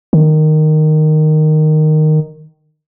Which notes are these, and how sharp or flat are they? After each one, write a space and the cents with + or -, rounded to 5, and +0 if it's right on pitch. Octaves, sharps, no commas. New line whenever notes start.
D#3 -10